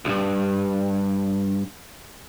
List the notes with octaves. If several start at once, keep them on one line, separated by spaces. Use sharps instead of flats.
B1 G2